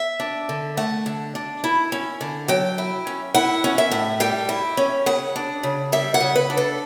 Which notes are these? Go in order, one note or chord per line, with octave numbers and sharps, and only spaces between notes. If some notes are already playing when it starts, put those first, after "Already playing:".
Already playing: E5
D4
D3
A3 F#5
D3
D4
E4
C#4
D3
F#3 G5
E4
C#4
E4 F#5
C#4
E5
A2
G3 G5
E4
C#4
C#3 F#5
D4
C#3
G3 E5
F#5
C#3
B4
D4
A4